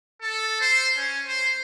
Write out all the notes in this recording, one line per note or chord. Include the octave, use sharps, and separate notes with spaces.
A4
C5
C#4
C5